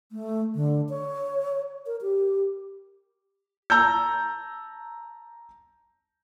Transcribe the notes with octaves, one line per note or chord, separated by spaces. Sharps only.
A3
D3
C#5
A#4
G4
A5 A#5 E6 G6